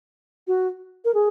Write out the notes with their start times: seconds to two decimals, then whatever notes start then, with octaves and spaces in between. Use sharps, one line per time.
0.47 F#4
1.05 A#4
1.14 G#4